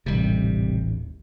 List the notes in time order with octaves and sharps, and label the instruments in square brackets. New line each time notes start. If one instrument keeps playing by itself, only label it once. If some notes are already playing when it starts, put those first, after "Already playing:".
[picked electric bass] D#1 A1 [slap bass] C3 G3